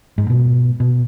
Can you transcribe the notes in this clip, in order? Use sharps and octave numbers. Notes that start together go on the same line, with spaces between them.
G#2
B2
B2